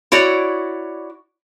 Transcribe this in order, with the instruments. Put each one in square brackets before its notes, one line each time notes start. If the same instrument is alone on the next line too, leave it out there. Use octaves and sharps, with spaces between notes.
[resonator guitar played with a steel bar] E4 F#4 C#5 D5